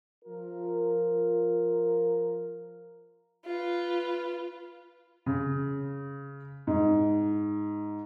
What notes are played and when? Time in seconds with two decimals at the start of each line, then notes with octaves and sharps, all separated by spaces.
0.25 F3 F4 A#4
3.46 F4 B4
5.26 C#3
6.67 G#2